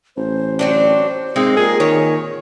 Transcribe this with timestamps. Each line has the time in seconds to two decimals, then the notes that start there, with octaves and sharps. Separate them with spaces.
0.16 A1 C5
0.59 F#3 C4 D4
0.88 C5
1.36 G#2 G#3 A#3 C4 D#4
1.57 A#2 G#4 A#4
1.80 D#3 C#5